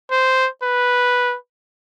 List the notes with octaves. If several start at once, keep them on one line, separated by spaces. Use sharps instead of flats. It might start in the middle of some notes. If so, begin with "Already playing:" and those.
C5
B4